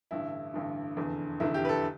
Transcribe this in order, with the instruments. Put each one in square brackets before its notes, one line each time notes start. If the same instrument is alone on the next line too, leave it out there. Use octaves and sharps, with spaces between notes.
[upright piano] A1 G2 D3 E4
A1 G2 D3
F1 E2 D3
F1 E2 D3 E4
G4
B4
A4